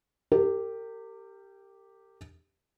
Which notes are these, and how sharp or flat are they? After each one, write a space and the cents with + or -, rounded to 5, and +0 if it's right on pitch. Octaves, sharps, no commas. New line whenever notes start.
G4 +0 A#4 -35